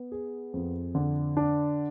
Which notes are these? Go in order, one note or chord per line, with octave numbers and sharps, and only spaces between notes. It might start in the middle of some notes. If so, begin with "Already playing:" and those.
Already playing: B3
G#4
F2
D3
D4